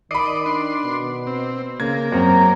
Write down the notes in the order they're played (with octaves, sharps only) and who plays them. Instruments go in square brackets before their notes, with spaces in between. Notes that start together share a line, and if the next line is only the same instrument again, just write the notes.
[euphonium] D#3 [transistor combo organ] D5 D#5 [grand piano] B5 C7
[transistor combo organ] D4 C6
[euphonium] B2
[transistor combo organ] C4
[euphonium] C#3 [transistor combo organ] A#3 [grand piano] G#6
[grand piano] F#2 [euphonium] C4 [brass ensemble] A#5